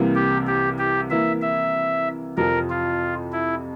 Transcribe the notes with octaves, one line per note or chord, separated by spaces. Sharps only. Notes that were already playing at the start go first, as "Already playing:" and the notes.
Already playing: C2 C3 E3 A#3 E4
G4
G4
G4
E3 A#3 E4 E5
E5
F2 C3 F3 C4 A#4
F4
E4